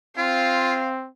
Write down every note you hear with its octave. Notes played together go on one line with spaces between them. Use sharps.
C4 F4 F5